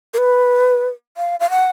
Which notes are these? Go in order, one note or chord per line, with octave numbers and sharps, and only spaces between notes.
A#4
B4
F5
F5
F#5